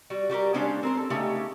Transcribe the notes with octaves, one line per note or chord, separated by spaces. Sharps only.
G3 F#4
G3 F#4 G4 A#4
C#3 G#3 C#4 D4 G4 C5
C4 A#4 C5
A4
C#3 A3 D#4 G4